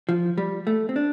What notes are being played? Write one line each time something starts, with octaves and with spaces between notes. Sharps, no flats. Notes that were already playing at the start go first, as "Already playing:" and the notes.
F3
G3
A3
C4
D4